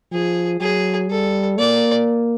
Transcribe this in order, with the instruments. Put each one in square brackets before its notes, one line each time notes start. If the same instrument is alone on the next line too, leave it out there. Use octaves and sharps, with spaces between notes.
[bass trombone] F3 [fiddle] G#4
[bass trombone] F#3 [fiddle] G#4
[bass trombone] G3 [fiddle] A4
[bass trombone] A#3 [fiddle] D5